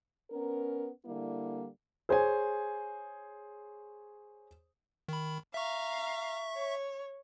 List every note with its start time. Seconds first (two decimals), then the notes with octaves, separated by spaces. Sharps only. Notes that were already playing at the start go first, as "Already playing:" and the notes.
0.31 B3 C#4 A#4
1.06 D3 G3 A#3 E4
2.09 G#4 C5 C#5 G#5
5.08 D#3 B5
5.54 E5 F5 A#5 C#6
6.53 C#5